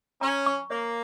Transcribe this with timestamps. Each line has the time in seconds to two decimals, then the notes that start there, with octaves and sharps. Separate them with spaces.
0.21 C#4 A#5
0.46 C#6
0.70 A#3 C#5